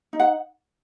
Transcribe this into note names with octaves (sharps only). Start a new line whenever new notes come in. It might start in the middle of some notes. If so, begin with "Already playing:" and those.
D#4
F#5